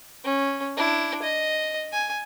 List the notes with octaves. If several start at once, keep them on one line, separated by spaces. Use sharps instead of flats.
C#4
D4 E4
D#5
G#5